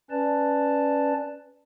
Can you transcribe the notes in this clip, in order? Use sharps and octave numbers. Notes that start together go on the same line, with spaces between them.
C#4 B4 D5 A5